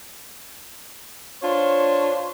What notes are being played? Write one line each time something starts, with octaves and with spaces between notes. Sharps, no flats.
D4 F4 C5 C#5